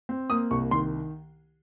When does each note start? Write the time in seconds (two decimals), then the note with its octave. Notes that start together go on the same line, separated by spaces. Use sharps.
0.09 C4
0.30 A#3 D#6
0.51 C2 C#6
0.71 D#3 C6